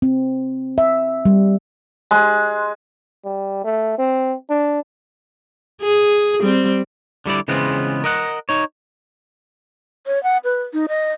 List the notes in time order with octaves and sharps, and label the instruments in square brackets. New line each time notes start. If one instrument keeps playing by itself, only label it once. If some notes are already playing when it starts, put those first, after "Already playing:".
[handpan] C4
E5
G3
[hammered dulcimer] G#3
[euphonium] G3
A3
C4
D4
[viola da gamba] G#4
G3 C4
[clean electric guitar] D3 G3 E4 D5
C#3 E3 G#3 B3 C4 F4
A#4 D#5 F#5
D#4 C#5
[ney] C#5
F#5
B4
D#4
D#5